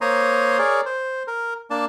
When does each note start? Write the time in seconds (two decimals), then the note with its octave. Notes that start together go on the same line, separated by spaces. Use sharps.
0.01 A#3 C5 C#5 A#5 C6 D#6
0.59 G#4 A#4 C#5 D5
0.86 C5
1.28 A#4
1.70 A#3 D4 A5